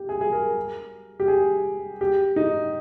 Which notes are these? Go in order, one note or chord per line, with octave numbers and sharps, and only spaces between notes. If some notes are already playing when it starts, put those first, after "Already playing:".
Already playing: G4
G#4
G#4
A#4
G4
G#4
G4
D#4